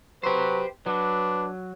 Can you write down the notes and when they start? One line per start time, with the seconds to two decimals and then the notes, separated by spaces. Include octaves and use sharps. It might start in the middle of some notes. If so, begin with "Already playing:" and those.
0.23 F#3 G4 B4 C5
0.86 F#3 D4 B4